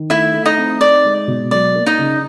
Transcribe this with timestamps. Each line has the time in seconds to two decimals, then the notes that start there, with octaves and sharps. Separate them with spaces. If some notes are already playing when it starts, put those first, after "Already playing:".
Already playing: D#3
0.10 A3 E4 E5
0.33 A3
0.45 D#4 D#5
0.58 C4
0.81 D#4 D5
1.05 G#3
1.27 B2
1.51 F#3 D5
1.75 A#3
1.86 D#4 D#5
1.98 C#3